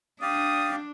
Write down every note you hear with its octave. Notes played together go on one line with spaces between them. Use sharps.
D4 G4 D5 F5 D#6